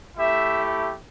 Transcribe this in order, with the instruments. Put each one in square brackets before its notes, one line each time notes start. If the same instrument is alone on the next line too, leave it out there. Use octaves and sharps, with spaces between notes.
[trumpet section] A3 E4 G4 E5